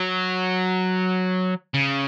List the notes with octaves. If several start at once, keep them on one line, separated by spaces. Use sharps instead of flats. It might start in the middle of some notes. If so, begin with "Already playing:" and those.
Already playing: F#3
C#3